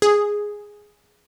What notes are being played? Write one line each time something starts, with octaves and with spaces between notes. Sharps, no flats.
G#4